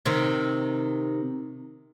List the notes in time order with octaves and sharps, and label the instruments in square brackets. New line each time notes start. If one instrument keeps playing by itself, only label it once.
[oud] C3 D#3 C4